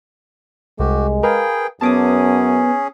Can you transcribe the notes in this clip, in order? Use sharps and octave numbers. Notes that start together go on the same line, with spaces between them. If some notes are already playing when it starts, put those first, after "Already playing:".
C2 G#3 F#4 G4
G#4 A#4 B4 F5 G5
F#2 B3 C#4 G#4 A5 D6 D#6